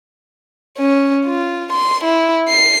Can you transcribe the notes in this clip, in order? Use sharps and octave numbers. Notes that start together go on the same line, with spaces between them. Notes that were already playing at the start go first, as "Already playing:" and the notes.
C#4
F4
C6
E4
C7